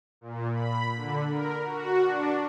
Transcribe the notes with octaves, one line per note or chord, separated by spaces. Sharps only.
A#2
B5
D3
A#4
F#4
D4